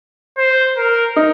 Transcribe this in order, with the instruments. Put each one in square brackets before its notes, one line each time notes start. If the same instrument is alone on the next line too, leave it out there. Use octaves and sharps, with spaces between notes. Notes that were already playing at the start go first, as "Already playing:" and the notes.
[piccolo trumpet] C5
A#4
[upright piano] D#4